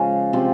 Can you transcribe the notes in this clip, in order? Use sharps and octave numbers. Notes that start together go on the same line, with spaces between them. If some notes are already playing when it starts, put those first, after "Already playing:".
Already playing: C#3 F3 G#3 C#4
C3 F3 C4